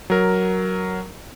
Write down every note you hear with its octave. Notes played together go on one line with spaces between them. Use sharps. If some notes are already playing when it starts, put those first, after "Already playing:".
F#3 A#4